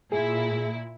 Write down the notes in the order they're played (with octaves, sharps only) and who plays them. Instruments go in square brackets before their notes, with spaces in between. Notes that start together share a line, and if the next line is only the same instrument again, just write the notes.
[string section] A#2 E4 [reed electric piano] G#4